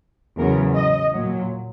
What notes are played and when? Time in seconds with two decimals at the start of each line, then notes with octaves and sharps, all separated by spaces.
0.39 E2 C#3 F#3 A#4
0.76 D#5
1.14 A#2 F#3